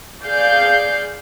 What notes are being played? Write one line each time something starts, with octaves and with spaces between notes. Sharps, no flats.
G#4 D5 F5 G6 C7